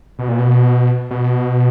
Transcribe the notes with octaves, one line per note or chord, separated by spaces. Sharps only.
B2
A#2
B2
B2